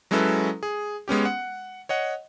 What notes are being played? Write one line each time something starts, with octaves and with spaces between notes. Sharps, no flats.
F#3 G#3 C#4 E4 A4 B4
G#4
G#3 B3 C#4 G4
F#5
C#5 D#5 F#5